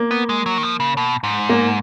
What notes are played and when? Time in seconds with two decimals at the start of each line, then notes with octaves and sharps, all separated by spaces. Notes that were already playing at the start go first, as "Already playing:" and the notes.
Already playing: A#3
0.11 B3
0.29 G#3
0.46 F#3
0.58 D#3
0.63 F3
0.80 C#3
0.97 B2
1.24 G#2
1.49 A#3